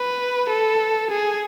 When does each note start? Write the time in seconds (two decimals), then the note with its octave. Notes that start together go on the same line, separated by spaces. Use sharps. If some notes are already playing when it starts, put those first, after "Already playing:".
Already playing: B4
0.49 A4
1.10 G#4